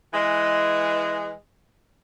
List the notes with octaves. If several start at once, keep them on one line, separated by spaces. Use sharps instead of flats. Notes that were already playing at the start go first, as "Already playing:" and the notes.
E3 G#3